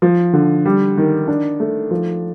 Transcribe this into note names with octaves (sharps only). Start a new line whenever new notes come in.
F3
D3
G3
D#3
D4
A3
F3